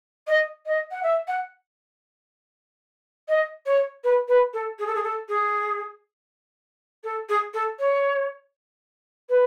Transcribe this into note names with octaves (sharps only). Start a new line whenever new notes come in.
D#5
D#5
F#5
E5
F#5
D#5
C#5
B4
B4
A4
G#4
A4
G#4
A4
G#4
A4
G#4
A4
C#5
B4